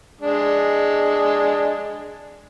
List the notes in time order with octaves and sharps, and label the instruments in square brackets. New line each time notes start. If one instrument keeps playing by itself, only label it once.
[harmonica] G#3 D4